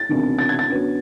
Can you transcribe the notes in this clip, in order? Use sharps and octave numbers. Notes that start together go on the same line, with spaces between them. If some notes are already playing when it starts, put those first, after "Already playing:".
Already playing: A6
E1 D2 C3 D#3
A6
G#6
A6
F#2 D3 F#3 B3